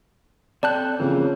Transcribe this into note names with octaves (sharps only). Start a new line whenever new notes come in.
C4 A4 D5 G5 A5 F#6
F2 C#3 E3 A#3 C#4